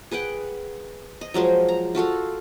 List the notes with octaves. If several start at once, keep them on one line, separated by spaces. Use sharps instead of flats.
G#4 B4 F#5 G5
D#5
F3 F#3 G#3 C5
A#5
F4 F#4 A4 F5